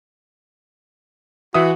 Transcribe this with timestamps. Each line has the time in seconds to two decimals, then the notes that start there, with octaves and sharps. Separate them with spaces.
1.54 E3 F#4 E5 D#6